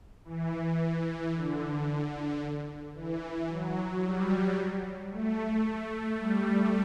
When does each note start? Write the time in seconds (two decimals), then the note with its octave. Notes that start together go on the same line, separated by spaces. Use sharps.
0.25 E3
1.33 D3
2.95 E3
3.48 F#3
4.03 G3
5.10 A3
5.64 A3
6.18 G3